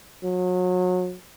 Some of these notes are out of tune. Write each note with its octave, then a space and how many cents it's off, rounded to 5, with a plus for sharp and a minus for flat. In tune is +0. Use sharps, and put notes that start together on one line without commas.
F#3 -30